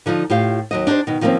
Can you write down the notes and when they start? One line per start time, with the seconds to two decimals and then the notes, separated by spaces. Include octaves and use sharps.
0.06 D3 F3 D#4 F4
0.30 A2 F4 G4 F5
0.71 D#2 F#3 D#5
0.87 D4 D#4 F#4 G4 C5
1.07 B2 D#3
1.21 D#3 F3 G3 A#3 C4 C#4